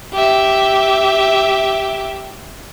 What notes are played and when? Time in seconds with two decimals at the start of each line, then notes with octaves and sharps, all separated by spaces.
0.12 G4 E5